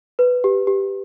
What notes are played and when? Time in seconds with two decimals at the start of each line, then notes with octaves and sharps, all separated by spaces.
0.19 B4
0.44 G4
0.67 G4